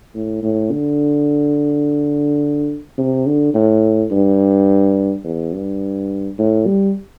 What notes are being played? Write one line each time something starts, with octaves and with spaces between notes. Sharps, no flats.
A2
A2
D3
C3
D3
A2
G2
E2
G2
A2
G3